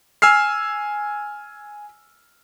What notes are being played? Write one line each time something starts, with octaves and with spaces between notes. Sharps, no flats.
G#5 E6 F6 C7